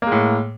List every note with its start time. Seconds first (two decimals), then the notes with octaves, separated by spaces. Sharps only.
0.02 A#3
0.07 G#3
0.12 A2